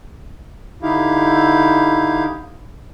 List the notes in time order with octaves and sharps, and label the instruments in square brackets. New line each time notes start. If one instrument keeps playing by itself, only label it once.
[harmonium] D3 D#4 E4 G4 F5